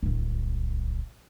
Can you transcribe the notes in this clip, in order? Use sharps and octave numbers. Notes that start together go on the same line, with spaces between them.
D1 C2